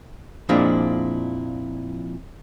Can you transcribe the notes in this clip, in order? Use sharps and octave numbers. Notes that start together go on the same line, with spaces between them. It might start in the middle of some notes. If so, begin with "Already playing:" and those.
F2 A#2 F3 G#3 D4 E4